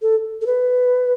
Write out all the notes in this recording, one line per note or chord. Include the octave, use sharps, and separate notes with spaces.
A4
A4
B4